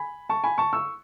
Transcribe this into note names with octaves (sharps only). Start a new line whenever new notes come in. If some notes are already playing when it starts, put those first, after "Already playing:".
Already playing: G#5 B5
A5 C#6
G#5 B5
A5 C#6
C#6 E6